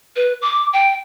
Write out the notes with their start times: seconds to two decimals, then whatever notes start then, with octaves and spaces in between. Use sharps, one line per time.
0.16 B4
0.42 D6
0.73 G5